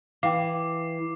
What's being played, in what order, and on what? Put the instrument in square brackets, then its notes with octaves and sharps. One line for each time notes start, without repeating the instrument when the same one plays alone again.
[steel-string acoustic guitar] E3 [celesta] F5 G5 [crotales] D6 C7